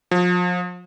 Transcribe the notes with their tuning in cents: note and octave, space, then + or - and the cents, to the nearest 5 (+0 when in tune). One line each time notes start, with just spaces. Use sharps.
F3 +35